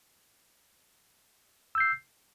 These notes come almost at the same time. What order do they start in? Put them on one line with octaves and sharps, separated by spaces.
E6 G6 C7